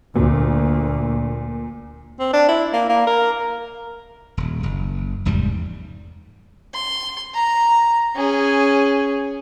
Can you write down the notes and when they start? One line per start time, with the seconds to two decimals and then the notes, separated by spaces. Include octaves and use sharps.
0.16 D2 A#2
2.19 C4
2.33 D4
2.48 E4
2.73 A#3
2.89 A#3
3.07 A#4
4.37 D#1
4.63 F#1
5.25 F1 E2 G#2 G3
6.73 C6
7.34 A#5
8.16 C#4 G#4